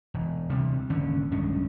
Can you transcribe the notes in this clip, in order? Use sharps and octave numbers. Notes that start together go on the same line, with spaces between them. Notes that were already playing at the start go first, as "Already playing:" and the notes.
E1
D2 C3 G3
G#1 D#2 D3 C#4
B1 G2 G#3 C#4